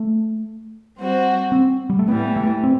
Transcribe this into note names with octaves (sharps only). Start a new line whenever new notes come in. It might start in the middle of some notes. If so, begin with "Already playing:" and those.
Already playing: A3
G3 C4 F#4 C5
C4
G3
A3
A2 E3 G3 B3
A3
C4